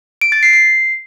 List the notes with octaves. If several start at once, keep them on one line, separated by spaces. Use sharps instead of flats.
D7
A6
C7
C7